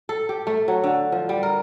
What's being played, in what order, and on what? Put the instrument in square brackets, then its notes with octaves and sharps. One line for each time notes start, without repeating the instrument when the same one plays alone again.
[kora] A4
G4
A3
F#3
D3
F3
G3
A#4